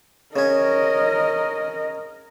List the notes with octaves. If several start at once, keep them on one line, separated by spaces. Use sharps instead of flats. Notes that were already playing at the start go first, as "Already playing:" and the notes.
C#3 C#4 A#4 D#5